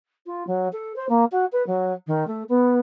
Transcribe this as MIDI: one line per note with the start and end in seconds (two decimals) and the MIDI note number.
0.26 0.44 65
0.47 0.68 54
0.73 0.95 69
0.96 1.06 72
1.09 1.25 58
1.32 1.45 66
1.52 1.65 71
1.67 1.93 54
2.07 2.26 51
2.27 2.43 57
2.49 2.79 59